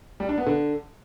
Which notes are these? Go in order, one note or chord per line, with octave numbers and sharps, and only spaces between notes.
G3
D4
B3
D3